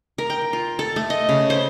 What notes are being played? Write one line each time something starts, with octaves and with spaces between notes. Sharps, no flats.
A#4
G5
F4
A4
A3
D#5
C#3
C5